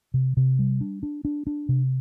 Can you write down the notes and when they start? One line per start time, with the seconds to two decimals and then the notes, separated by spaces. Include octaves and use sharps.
0.14 C3
0.37 C3
0.59 G3
0.81 D4
1.03 D4
1.25 D4
1.47 D4
1.69 C3